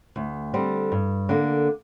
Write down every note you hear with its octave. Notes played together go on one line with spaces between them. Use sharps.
D2
D3 G3 C4
G2
D3 A#3